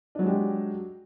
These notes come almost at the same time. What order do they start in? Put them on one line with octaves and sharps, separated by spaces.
D4 F#3 G#3 G4